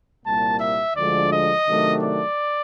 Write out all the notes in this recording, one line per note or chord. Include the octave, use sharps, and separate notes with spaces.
C2 A#2 G3 A#3 A5
E5
D2 D3 F3 G#3 D5
D#5
C3 D#3 F#3 A3 D4
D5